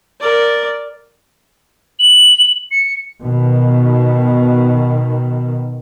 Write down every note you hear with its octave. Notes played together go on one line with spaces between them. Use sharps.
A#4 D5
F#7
C#7
B2 D#3